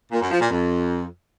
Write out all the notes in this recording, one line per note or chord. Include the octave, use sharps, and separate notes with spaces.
A#2
F#2
F3
A#2
F2